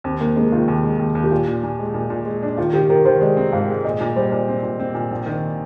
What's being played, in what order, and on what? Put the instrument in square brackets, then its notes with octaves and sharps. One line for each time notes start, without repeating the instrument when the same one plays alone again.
[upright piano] D#2 [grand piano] C4
[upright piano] D#2 [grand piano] A#3
[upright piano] G#3 [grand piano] A#3
[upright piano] D#3 [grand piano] F4
[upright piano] D#2
G#3
D#2
D#2
[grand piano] G4
[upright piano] A#2 [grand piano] F4
[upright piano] A#2
A#2
G#3
A#2
A#2
G#3
D4
[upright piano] D#3 [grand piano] F4
[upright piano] D#3 [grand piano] G4
[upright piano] D#3 [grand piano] A#4
[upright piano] D#3 [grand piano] C5
[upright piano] G#3 [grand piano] D5
[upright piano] C4
[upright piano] G#2 [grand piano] F5
[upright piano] G#3
[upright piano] A#2 [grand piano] D#5
[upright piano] A#2
[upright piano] G3 [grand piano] C5
[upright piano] A#2
C4
A#2
C4
A#2
A#1
D#3